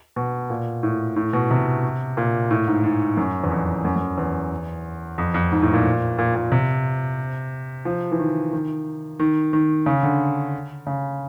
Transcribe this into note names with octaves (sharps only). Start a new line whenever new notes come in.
B2
A#2
A2
A2
B2
C3
A#2
A2
G#2
G#2
F#2
E2
F2
F#2
F#2
E2
F2
F2
G#2
A2
A#2
A#2
A#2
C3
F3
E3
D#3
D#3
D#3
D#3
C#3
D3
C#3